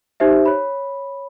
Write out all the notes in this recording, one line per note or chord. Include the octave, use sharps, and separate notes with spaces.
D#4 G4 C5 E5
C#5 B5